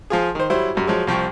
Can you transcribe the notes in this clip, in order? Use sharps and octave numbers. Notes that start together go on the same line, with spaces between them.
F3 F4 G#4
D#3 C5
F#3 G3 E4 C5
F#2 G3
F3 F#3 G#3
C2 F3 G5 C#6